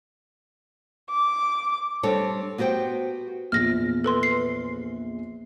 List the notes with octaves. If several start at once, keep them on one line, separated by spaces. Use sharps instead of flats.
D6
G3 C4 D4 A4 C#5
B3 F#4 G4 C5 G5
A#1 E2 F4 F6 A#6
A4 B4 C6
C7